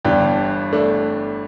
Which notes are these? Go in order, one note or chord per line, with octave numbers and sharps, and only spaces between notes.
G1 G2 E3 D4 G4
A3 D4